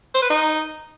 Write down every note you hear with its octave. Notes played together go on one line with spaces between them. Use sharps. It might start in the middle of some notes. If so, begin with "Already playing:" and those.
C5
B4
D#4